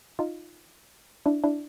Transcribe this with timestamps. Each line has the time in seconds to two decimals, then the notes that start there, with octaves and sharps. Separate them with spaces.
0.19 D#4 F4
1.26 D4 E4
1.44 D4 E4